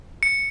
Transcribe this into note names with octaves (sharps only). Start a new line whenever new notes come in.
C#7